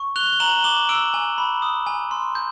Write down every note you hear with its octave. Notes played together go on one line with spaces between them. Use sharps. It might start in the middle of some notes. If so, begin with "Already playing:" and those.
Already playing: C#6
F#6 F7 G7
G7
A#5 E7 F#7
G7
D6 E7 F#7
E6 D7 E7
G#5
B5
D#6
G#5
C6
G6